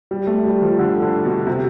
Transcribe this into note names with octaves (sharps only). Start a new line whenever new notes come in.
G3
A3
G3
F3
D3
D3
B2
C3